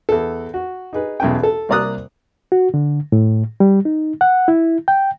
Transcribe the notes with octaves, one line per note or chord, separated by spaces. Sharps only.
E2 A4
F#4
D#4 G#4 B4
B1 E2 C#4 G5
A4
C2 A#3 D5 A#5 D#6 F#6
F#4
D3
A2
G3
D#4
F#5
E4
G5